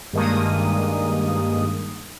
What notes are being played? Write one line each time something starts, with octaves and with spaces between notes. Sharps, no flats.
G2 D#3 G#3 A#3 D#6